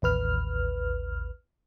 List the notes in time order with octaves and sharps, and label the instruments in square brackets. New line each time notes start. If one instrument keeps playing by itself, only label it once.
[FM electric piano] A1 D#2 B4 F6